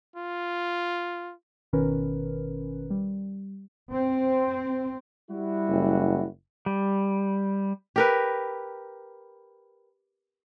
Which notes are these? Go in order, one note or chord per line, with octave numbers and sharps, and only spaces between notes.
F4
G#1 B2 D#3 C#4 A#4 B4
G3
C4
G3 E4 F#4
F#1
G3
G4 A#4 B4